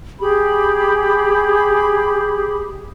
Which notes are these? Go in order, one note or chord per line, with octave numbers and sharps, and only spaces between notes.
G4 G#4 B5